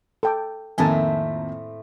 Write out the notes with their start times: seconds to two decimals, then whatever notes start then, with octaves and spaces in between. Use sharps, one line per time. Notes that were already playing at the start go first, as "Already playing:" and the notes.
0.23 A4 G5 D6
0.78 F2 A2 D#3 A3 A#3 C4 G#5 A5